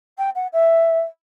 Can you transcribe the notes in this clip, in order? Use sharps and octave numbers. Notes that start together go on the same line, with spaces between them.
G5
F#5
E5